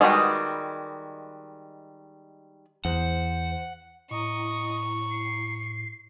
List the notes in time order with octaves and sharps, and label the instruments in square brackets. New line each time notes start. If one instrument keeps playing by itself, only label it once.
[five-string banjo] D#3 G3 G#3 F#4 B4
[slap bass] E2 [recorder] C5 [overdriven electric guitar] F#5
[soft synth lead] A2 [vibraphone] E4 A#5 [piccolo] D#5 [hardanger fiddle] C#6
[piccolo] C7